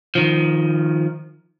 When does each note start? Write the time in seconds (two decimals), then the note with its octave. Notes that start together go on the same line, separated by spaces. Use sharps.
0.15 D#3 F3